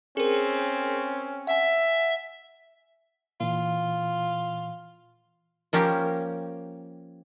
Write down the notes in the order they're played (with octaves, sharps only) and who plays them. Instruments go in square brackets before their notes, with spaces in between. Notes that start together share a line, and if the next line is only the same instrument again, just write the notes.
[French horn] C4 [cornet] C#4 [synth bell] G#4 A#4
[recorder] E5 [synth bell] F#5 G#5
[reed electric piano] A#2 E3 [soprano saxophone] F4
[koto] F3 A#3 C#4 G4